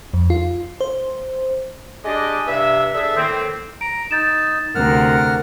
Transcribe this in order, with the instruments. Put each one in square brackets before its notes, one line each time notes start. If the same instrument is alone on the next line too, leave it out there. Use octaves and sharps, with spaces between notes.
[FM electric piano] F2
F4
C5
[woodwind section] G#3 D4 G4 D5 D#5
G2 C3 B4 E5
D4 G#4 A4 E5
A2 D#3 A#3 C4
[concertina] A#5 [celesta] D7
[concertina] D#4 [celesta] G6 A6 E7
[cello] D2 C3 [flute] A#4 [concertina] F#5 F6